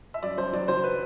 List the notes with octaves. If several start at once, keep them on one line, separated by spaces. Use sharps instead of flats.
E5
F#2 D5
F#2 C5
F#3 D5
F#3 C5
B4